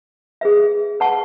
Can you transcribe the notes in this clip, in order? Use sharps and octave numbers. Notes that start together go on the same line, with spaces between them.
G#4 B4 E5
B4 F#5 A5 C#6